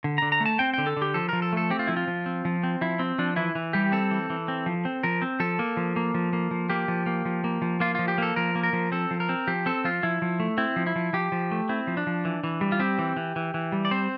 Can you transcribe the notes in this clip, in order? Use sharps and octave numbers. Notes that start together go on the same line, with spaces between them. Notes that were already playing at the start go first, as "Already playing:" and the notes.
D3
D3 A#5
A#5
A3
A5
C4 G5
D3 G5
A4
D3
G4
F3 A4
F3 A#4
A4
A3 A4
C4 G4
F4
F3 E4
F4
F3
C4
F3
C4
F3 E4
C4
F3 D4
E3 E4
E3
G3 G4
C4 A4
E3
E3
C4
F3
C4
F3 A#4
C4
F3 A4
A#3
F3
A#3
F3
A#3
F3
A#3 G4
F3
A#3
F3
A#3
F3
A#3 F4
F3 F4
G4
A#3 A4
F3 A#4
A#3
A#4
F3
C4 A4
F3
A#4
C4
F3 G4
C4 A4
F3 F4
F3 E4
F3
A3
C4 E4
F3
E4
F3
F3 G4
F3
A3
C4 E4
F3
D4
F3
E3
E3
G3
F4
C4 G4
E3
E3
E3
E3
G3
D5
C4 C5